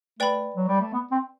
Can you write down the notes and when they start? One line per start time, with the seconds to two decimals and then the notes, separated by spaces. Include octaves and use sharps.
0.19 A3 B4 D5 G5 B5
0.56 F#3
0.68 G3
0.81 A3
0.93 B3
1.11 C4